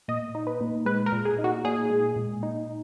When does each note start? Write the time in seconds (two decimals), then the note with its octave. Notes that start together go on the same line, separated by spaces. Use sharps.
0.08 A#2 D#5
0.35 D#4
0.47 B4
0.61 A#2
0.86 G#3 B4
1.06 A#4
1.12 A#2
1.25 G#4
1.39 D#4
1.44 F#4
1.65 A#2 G#4
1.90 G#3
2.16 A#2
2.43 D#4